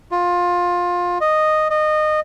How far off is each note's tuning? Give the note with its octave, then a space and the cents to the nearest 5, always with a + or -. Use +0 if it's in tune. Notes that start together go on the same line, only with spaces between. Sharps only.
F4 +20
D#5 -5
D#5 -20